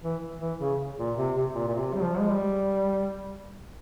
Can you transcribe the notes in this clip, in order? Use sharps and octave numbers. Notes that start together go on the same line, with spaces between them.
E3
E3
C#3
A#2
C3
C3
A#2
A#2
C3
G3
F3
G#3
G3